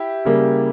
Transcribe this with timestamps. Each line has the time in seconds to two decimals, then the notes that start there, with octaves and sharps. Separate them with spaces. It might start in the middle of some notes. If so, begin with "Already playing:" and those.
Already playing: E4 G4
0.25 C#3 G3 A#3